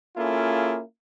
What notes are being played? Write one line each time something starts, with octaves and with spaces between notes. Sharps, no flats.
A#3 C#4 E4 F4 G#4 A4